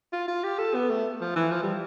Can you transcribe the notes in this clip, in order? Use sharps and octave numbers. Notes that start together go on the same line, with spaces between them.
F4
F4
G4
A4
B3
A3
F3
E3
F3
G3